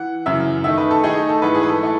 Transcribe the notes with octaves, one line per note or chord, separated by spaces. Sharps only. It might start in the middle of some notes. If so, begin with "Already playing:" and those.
Already playing: E3 F#5
F#2 C#3 E3 E5
D#3 A3 D#4 E5
B4
A4
D#3 A3 D#4 G#4
A4
G#2 E3 A3 B4
G#4
B4
A4
E3 A3